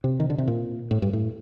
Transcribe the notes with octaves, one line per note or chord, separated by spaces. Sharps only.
C3
D#3
D3
C3
A#2
A2
G2
A2